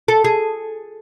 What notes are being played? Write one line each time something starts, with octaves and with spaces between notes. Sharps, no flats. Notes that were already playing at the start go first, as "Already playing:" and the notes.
A4
G#4